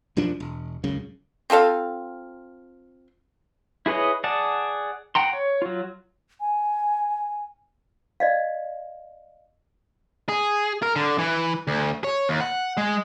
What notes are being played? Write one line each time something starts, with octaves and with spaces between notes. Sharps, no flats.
E1 F#2 F3 D4
E1
D#1 C#2 F#2 C#3
C4 F4 A4 F5
E4 G#4 B4 C#5 D#5
G#4 D5 F#5 A5
F#5 G5 A#5 C6
C#5
F#3 F4
G#5
D5 D#5 F5
G#4
A#4
D3
E3
D2
C#5
D#2
F#5
G#3